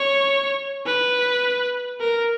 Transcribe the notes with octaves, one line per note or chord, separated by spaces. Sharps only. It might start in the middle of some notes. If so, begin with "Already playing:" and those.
Already playing: C#5
B4
A#4